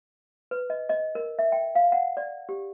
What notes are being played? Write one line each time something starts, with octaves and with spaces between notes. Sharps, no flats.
B4
D#5
D#5
A#4
E5
G5
F5
F#5
D5
G4